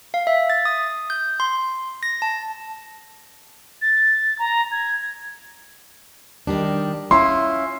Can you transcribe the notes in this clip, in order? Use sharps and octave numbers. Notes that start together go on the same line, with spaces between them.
F5
E5
A6
D#6
G6
C6
A#6
A5
A6
A#5
G#6
D#3 G3 D4
C#4 E4 F4 C6